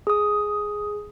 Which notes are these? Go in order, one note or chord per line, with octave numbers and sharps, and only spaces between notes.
G#4 D#6